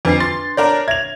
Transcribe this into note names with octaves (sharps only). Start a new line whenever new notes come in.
F2 D4 B4 D6 C7
C6 A6
D4 A#4 C#5 D5
E5 G#6 F7